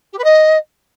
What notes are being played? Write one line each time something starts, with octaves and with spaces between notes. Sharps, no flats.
G4
B4
D#5